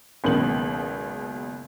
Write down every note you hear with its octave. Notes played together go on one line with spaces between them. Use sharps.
F#1 C#2 B2 D#3 F#7